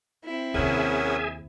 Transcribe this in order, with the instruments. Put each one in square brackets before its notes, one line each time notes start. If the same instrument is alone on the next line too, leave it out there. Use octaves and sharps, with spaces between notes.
[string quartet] C4 E4
[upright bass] D#2 C3 [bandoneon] C#4 A#4 F#5 [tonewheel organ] G#4 E5 G#5